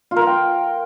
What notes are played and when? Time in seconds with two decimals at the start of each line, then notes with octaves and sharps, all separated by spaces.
0.11 F4
0.16 A#4
0.22 F4
0.27 G5